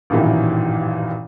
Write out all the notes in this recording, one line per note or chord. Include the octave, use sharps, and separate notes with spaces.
A1 G2 A#2 D#3 E3 F#3